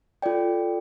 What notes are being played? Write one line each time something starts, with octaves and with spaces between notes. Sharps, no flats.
F4 A4 D5 G5